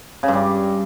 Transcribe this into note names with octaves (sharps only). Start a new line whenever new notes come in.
C#3
G2
G3